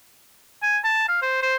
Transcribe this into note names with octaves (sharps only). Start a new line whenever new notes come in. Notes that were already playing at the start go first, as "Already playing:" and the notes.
G#5
A5
F5
C5
C5